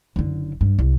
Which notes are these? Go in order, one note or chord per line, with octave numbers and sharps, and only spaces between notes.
F#1 D3
G2
C2